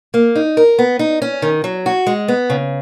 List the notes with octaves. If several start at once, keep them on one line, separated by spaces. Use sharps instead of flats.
A#3
D#4
A#4
B3
D#4
C#4
D#3
F#3
F#4
G#3
B3
C#3